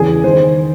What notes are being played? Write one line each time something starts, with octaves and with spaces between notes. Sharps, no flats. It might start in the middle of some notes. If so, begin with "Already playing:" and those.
Already playing: E2 C#3 E3 G#4
D#3 C5